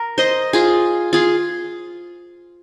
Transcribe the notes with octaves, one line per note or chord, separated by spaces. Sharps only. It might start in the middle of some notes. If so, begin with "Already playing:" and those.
Already playing: A#4
C5 D#5
F4 G#4
F4 G#4